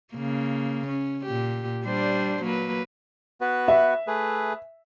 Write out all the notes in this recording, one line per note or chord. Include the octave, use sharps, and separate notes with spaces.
C#3 A#3
C#4
A#2 G4
G3 D4 C5
F#3 A#3 B4
B3 F#4 B4
E5
A3 G#4 B4